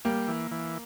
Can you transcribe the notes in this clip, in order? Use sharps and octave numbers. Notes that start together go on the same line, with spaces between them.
G3 A#3
E3
E3